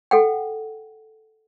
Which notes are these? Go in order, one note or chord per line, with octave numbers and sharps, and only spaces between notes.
A4 F#5 G5